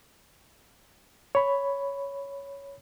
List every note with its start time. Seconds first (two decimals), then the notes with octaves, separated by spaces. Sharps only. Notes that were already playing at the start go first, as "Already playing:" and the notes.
1.35 C#5 B5